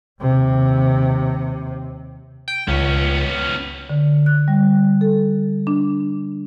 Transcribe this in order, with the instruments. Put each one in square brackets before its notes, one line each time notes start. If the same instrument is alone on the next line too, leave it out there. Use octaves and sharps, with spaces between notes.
[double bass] D#2 C3
[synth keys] G5
[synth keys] C#2 [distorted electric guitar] B3 C#4
[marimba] D3
F#6
G3
A4
D4